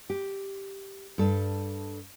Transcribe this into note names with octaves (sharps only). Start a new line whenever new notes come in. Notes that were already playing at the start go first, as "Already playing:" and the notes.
G4
G2 A4